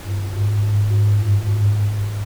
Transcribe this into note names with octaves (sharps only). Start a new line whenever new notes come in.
G2
G#2
G#2
G#2
G2
G#2